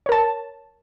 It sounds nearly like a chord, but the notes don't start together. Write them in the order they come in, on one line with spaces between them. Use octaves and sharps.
C#5 A#4 A5